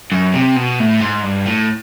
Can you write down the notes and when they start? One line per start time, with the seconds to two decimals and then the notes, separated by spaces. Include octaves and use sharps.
0.12 F#2
0.34 C3
0.56 B2
0.80 A2
1.01 G#2
1.23 G2
1.46 A2